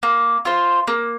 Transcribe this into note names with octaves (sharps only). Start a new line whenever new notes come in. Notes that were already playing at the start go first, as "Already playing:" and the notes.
A#3
F4 C5
A#3